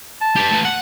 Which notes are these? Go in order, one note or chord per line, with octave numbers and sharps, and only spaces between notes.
A5
G4 B4
A3 B4
F#5